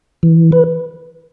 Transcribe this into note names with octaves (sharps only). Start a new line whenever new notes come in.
E3
B4